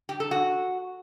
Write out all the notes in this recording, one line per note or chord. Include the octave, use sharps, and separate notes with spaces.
G4
A4
F#4